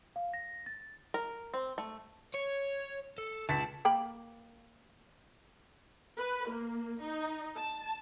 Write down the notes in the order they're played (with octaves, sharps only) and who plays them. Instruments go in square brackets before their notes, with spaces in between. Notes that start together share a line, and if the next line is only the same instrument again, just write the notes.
[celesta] F5
A#6
A6
[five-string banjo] A#4
C4
A3
[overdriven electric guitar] C#5
A4
[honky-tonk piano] C#2 A6 B6 [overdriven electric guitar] A5
[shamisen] A#3 G5 B5
[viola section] B4
A#3
D#4
A5